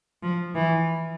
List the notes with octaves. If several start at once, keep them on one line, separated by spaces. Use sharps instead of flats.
F3
E3